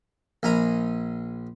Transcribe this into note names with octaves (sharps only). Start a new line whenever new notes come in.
A#1 G#5 A#5 B5